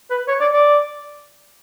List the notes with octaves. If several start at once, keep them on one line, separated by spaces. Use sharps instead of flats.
B4
C#5
D5
D5